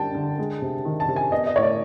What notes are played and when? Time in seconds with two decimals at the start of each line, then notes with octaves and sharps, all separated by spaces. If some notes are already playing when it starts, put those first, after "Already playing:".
Already playing: D3 G3 G5 A5
0.15 D3
0.39 G#3
0.62 C3
0.85 D#3
1.00 A5
1.08 C3
1.16 G#5
1.32 B3 D#5
1.47 D#5
1.56 A2 C#5
1.63 D5